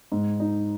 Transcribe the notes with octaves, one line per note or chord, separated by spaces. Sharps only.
G#2
D#4